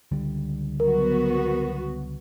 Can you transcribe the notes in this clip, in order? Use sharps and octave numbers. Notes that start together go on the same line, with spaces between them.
C#2 D3 G3
F#3 B3 F#4 A#4